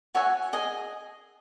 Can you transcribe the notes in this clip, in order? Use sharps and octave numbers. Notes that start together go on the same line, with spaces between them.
F#4 C#5 E5 G#5
G#4 D#5 G#5